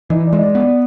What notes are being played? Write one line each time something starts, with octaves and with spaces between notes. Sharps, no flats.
E3 D#4 D#5
D5
G#3
D#5
D5
B3
D5